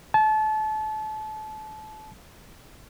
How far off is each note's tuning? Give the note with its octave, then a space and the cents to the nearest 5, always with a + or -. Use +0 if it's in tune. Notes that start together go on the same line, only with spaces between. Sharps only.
A5 -30